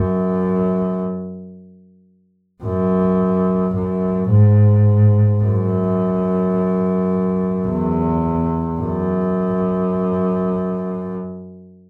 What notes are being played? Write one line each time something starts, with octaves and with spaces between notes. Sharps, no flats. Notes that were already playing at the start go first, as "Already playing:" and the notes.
Already playing: F#2
F#2
F#2
G#2
F#2
E2
F#2